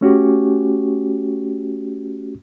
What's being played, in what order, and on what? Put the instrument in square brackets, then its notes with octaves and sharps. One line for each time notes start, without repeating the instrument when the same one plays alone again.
[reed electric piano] A3 C#4 F#4 G4